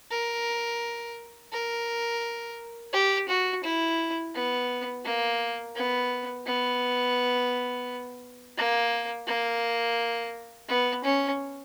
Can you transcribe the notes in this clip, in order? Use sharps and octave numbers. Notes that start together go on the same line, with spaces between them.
A#4
A#4
G4
F#4
E4
B3
A#3
B3
B3
A#3
A#3
B3
C#4